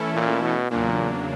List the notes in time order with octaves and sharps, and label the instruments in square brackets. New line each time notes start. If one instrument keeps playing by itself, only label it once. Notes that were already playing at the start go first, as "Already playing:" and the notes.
Already playing: [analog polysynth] E3 A3 C#4 E4 A4
[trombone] A#2
B2
[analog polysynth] E2 C#3 F#3 A#3 D4 [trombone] A#2